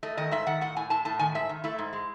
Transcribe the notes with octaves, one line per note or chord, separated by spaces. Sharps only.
A3 D#5
D#3 D#5
G#2 E5
D#3 F#5
A2 F#5
A2 G#5
A2 A5
A2 A5
D#3 G#5
G#2 E5
D#3
A3 E4
G#2
G#3